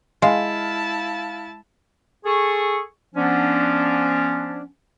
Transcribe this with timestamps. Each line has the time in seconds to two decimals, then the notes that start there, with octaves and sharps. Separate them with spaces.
0.22 G#3 E4 F5 A5
2.25 G#4 A4 C#6
3.15 F3 B3 C#4 D4